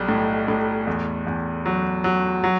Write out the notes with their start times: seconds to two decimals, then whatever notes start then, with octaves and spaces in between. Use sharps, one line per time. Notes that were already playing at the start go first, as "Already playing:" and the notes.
Already playing: B1 G3
0.09 A2
0.48 A2
0.87 E2
1.27 E2
1.66 F#3
2.04 F#3
2.44 F#3